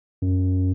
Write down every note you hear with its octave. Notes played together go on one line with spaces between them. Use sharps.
F#2